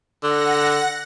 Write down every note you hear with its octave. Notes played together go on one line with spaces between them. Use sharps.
D3 F#5 A#6